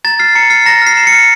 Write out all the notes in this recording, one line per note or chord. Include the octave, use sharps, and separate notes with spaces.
A#5 A6
F6 C7
A#5 C#7
F6 C7
A#5 A#6
F6 C7
A#5
C#7
F6